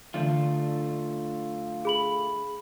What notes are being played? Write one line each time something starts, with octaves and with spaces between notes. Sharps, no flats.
D3 E3 A3 D4 F4
G#4 B5 F#7